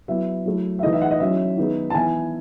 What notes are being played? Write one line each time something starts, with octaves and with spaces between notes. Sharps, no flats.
F#3 B3 E4 E5
F#3 A3 E4
E5
E3 A3 D#4 D#5
E5
F#5
D#5
F#3 C#4 E4 E5
D#3 G#3 B3 D#4
A5
E3 B3 E4 G#5